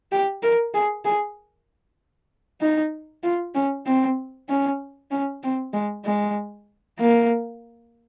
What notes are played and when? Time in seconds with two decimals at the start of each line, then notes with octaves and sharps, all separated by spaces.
0.12 G4
0.43 A#4
0.74 G#4
1.05 G#4
2.61 D#4
3.23 F4
3.55 C#4
3.86 C4
4.50 C#4
5.11 C#4
5.43 C4
5.74 G#3
6.05 G#3
6.99 A#3